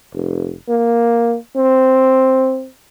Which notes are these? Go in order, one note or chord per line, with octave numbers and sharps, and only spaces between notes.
F1
A#3
C4